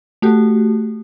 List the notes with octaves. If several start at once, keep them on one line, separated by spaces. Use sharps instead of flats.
A3 F#4 G4